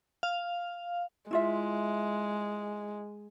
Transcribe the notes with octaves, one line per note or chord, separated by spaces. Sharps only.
F5
G#3 E4 F4 E5